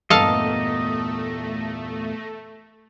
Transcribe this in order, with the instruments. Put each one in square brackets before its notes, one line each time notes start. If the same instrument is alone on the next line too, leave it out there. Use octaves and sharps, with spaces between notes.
[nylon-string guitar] E2 G2 A#2 [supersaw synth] A3 [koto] A4 F5 A5 [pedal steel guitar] D#5